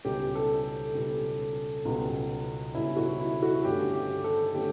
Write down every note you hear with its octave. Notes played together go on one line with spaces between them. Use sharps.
C#2 B2 G3 C#4 G4
A4
C#2 B2 G3 C#4
C#2 B2 G3 C#4
C#2 B2 G3 C#4 E4
F#4
E4
F#4
G2 D3 A3 C#4 G4
G4
A4
D3 A3 C#4 G4